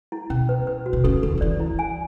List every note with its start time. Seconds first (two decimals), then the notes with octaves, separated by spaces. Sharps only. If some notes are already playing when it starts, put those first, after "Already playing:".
0.12 E4
0.30 B2 C#4
0.49 B4
0.67 B4
0.86 F#4
0.93 B2
1.04 C#3 A4
1.22 D3 A4
1.38 F#3
1.41 E3 D5
1.60 E4
1.79 G#5